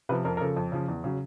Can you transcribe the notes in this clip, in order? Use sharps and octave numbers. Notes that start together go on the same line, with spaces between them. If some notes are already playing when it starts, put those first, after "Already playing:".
C3 F3 B4
F2 A#4
A#4
C#3 F3 A4
F2
C#3 F3
E2
C#3 F#3